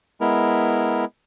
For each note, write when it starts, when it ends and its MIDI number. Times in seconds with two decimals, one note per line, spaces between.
0.21 1.05 56
0.21 1.05 59
0.21 1.05 64
0.21 1.05 70